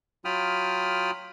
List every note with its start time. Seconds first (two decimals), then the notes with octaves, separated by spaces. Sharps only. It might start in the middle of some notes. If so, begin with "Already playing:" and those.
0.25 F#3 F4 G5 B5 D#6 F6